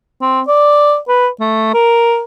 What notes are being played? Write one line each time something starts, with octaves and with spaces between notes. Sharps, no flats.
C4
D5
B4
A3
A#4